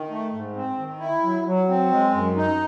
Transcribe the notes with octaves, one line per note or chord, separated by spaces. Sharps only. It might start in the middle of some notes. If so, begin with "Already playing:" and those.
Already playing: D#3
A3
G#2
C4
D#3
E4
F#3
F#3
C4
G#3
F#2
D#4